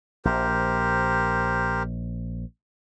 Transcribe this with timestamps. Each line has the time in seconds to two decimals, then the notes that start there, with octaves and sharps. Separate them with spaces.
0.25 A#1 G4 A#4 C5